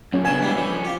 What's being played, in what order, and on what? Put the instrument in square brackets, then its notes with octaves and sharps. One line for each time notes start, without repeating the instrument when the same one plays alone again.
[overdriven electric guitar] F#2 A#2 [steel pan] C#4
[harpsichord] C#3 A5 [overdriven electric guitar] B3 D4 [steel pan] G#5
[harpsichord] E3 G3 G#3
[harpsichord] E3 [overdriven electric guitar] F3 C#4
[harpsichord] F4 G4